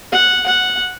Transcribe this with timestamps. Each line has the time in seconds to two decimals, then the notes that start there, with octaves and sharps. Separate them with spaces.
0.12 F#5
0.46 F#5